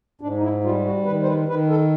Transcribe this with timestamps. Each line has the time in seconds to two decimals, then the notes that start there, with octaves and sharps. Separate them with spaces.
0.21 G#2 D4
0.37 D#4
0.43 E4
0.64 G3 F4
0.85 F#4
1.06 D#3 B4
1.23 C5
1.27 B4
1.48 D#3 B4
1.69 A4